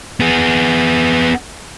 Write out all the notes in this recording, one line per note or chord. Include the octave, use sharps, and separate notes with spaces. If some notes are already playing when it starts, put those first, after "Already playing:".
B3 G#4